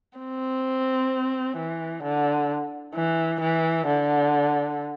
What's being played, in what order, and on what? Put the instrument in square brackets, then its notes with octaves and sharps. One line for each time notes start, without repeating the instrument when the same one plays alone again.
[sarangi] C4
E3
D3
E3
E3
D3